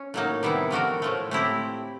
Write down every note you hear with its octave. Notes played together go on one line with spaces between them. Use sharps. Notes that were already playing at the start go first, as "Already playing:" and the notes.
Already playing: C#4
A2 F#3 A#3 D#4
C3 D#3 G3 B3 E4
F3 A3 D4 F#4 A#4
A2 F3 A3
A3 C4 E4 G4